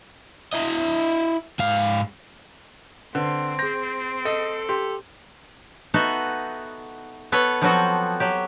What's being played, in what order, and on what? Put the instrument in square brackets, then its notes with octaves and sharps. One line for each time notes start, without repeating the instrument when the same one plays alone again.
[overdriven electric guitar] E4 D#5
G#2 F5
[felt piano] D3 [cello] C4 [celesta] B4
[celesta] G#4 G6 [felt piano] A#6
[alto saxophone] A4 [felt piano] D#5
[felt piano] G4 [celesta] C6
[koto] B3 D#4 F#4 A4 E5
B3 A4 B4 C#5
F3 F#3 B3 C4 F#4 A4
F#3 G4